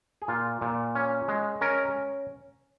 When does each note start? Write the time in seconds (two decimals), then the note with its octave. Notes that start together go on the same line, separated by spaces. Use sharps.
0.22 G#4
0.28 A#2 F4
0.61 A#2
0.95 C#4
1.28 G#3
1.61 C#4 A#4